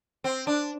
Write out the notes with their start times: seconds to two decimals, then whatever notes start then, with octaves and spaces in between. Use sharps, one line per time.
0.24 C4
0.47 D4